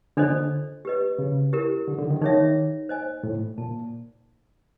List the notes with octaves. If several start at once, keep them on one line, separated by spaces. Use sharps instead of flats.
D3 D4 F4 A4 C5 D#5
G4 B4 D#5
C#3
E4 G4 A#4
D3
D3
D#3
D#3 D#4 G#4 C#5 E5
C5 D#5 G#5
A2
A#2 A5